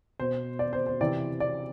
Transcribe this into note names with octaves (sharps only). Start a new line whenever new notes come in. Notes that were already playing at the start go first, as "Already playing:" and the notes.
B2 C5
D5
C5
C5
C3 E3 D5
D5